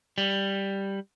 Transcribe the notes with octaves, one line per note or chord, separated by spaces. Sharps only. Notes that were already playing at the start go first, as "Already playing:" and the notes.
G3